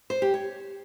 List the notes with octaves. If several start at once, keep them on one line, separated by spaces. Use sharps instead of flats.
C5
G4
C#5